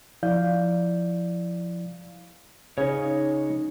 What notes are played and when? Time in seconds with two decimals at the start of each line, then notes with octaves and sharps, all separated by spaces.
0.23 F3 E4 D5 F5 G6
2.78 C#3 D#4 C#5